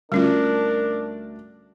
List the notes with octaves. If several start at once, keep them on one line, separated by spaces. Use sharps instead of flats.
D2 G3 A3 C#4 D4 F4 A#4